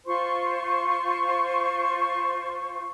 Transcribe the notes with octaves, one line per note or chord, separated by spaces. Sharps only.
F4 C5 C6 C#6